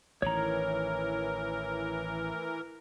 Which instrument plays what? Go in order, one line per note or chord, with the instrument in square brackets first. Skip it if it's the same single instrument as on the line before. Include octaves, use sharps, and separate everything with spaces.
[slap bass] A1 D#3 [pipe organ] E3 A#4 [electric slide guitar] C#5 A#5